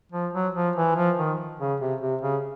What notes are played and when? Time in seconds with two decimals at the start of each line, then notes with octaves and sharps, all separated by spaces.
0.12 F3
0.33 F#3
0.55 F3
0.76 E3
0.96 F3
1.18 D#3
1.59 C#3
1.80 C3
2.01 C3
2.22 C#3